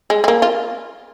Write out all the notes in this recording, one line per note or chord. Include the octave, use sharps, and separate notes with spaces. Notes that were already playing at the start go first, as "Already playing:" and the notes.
G#3
G#3
A#3
F4